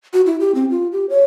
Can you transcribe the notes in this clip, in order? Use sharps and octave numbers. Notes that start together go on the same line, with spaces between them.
F#4
E4
G4
C4
F4
G4
C#5